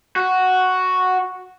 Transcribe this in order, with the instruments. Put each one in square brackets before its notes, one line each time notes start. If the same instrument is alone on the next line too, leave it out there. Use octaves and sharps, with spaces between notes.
[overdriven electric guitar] F#4